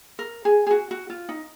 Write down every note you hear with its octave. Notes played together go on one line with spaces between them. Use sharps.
A#4
G#4
G#4
F#4
F#4
F4
D#4